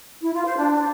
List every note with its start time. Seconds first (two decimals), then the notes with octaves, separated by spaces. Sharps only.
0.22 E4
0.34 F4
0.45 C5
0.57 D4